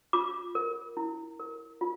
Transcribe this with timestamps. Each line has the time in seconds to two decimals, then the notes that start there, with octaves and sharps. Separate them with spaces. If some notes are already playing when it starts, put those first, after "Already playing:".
0.13 F4 D6
0.55 A#4
0.97 E4
1.40 A#4
1.81 F4